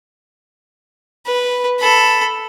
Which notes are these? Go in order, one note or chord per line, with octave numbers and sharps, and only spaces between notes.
B4
A4 B5